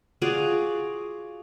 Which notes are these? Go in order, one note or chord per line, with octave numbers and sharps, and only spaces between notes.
F4 F#4 G#4 D5